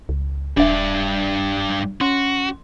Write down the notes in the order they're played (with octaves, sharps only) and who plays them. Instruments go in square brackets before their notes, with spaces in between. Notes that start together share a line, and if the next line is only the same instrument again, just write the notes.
[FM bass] C#2
[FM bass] D#1 [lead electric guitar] G2 D5 [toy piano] D4 E5
[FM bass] C#4 [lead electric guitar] F#4 [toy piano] C6